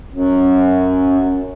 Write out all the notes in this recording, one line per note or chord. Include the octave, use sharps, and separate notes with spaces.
F#2